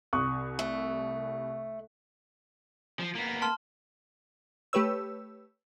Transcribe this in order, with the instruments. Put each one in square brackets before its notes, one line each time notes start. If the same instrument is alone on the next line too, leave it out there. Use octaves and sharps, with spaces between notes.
[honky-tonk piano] C2 [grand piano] C#6 D#6 F#6
[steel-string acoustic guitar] A3
[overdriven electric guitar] F3
A#3 B3
[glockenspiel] A5 C6 F6
[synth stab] A3 G4 B4 C#5 E6